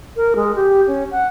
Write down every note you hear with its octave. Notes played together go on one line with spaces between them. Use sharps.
A#4
G#3
G4
C#4
F#5